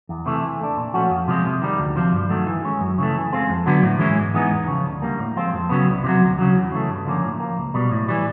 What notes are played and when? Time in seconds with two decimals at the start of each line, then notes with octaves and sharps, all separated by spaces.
0.09 E2
0.26 C3 E3 A3
0.42 E3
0.60 A3 D4
0.77 A#2
0.94 F3 A3 C#4 F#4
1.10 F2
1.28 C3 F3 G#3
1.45 C3
1.62 D#3 G3
1.78 D2
1.96 C3 F3
2.13 G2
2.29 D#3 F#3 A3
2.47 E3
2.64 G#3 C#4
2.80 F#2
2.98 C#3 E3 A3
3.15 E3
3.32 G#3 C4 F4
3.49 F2
3.66 D3 F#3 B3
3.83 A2
3.99 E3 G#3 C#4 E4
4.18 G#2
4.34 E3 G#3 B3 D#4
4.51 E2
4.68 C#3 F3
4.85 D2
5.02 D3 G3 A#3
5.19 A2
5.36 F3 G#3 C4 F4
5.53 F2
5.69 C#3 F#3 B3
5.87 C2
6.04 C3 D#3 F#3
6.21 D2
6.39 C#3 F#3
6.54 E2
6.72 C#3 E3 A3
6.89 G2
7.05 D3 F3 A#3 C#4
7.23 A2
7.40 F3 A#3
7.58 C#2
7.74 B2 G3
7.92 A2
8.08 E3 G3